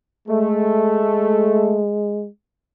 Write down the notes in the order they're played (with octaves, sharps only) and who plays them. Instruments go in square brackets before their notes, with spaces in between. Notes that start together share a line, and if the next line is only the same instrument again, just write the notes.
[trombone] G#3 [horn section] A3